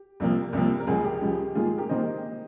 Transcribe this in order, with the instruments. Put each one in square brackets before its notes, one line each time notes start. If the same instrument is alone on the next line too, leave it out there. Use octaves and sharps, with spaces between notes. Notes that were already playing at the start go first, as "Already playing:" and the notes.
Already playing: [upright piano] G4
C2 C3 F3 A#3
C2 C3 F3 A#3
A#4
C#2 C#3 F3 G#3 F4 G#4
G4
C#2 C#3 F3 G#3
G#2 D#3 A#3 F4 G#4
G4 A#4
D#3 A#3 C5 D#5